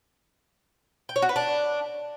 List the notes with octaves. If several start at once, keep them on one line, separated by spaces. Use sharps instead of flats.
G5
C#5
F#4
B4
D4